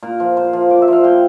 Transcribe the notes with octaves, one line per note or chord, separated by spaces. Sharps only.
A#2 A#4
F3
A#2 C5
F3
A#2 D5
E5
F3 F5
A#2 G5